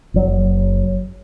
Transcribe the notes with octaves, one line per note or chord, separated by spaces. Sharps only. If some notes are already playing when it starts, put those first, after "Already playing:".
F#1 F#3